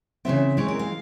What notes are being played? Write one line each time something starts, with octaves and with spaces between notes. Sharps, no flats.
C#3 E3 G#3 C4 E5
E3 G#3 C4 C#5
A#4
F5